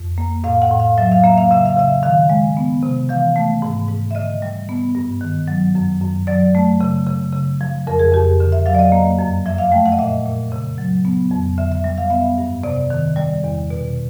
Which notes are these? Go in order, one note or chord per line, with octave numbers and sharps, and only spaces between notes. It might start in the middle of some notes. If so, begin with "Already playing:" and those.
Already playing: F2
A#3
A2 F5
F#5
A2
F5
F#3 E5
F5
A#3 E5
F5
C#3 E5
F5
C#3 E5
D#3 F5
G#3
B3
C3
E3 F5
A3
G#2
G#2
E5
D3 D#5
G3
B3
G2
D#3
F#3
F#2
F#2
F#3 D5
A3
C#3
C#3
C#3
F3
F2 A#4
G#4
F2 G4
D3
E5
F#3 F5
D5
D#5
A#3
F#2
F3 E5
F5
A3 G5
F#5
D#5
A#2 E5
A#2
C#3
F#3
B3
F2
D3 E5
E5
G3
F5
B3 E5
G2
C3 D5
D#3
G3 D5
E2
B2